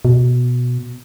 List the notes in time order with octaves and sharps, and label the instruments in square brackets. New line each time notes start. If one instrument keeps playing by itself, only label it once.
[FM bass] B2